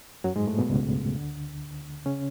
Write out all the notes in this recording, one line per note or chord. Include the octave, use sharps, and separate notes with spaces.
F#2 F#3
G#2 G#3
A2 A3
B2 B3
C#2 C#3
D2 D3
C#3 C#4